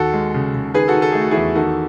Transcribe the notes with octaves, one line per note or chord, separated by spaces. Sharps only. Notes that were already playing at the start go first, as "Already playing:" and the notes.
Already playing: D#2 F#4 A4
G#3
C#3
C#3
D#3 G#4 B4
F#4 A4
D#3
A4
A3 G#4
F#4
E2 E4 G#4
D#3 F#4 A4